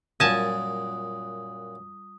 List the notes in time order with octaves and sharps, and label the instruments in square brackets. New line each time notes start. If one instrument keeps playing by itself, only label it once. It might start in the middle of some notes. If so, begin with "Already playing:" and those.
[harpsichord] F#2 A#2 [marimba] G3 F4 [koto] G#5 A5 [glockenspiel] D#6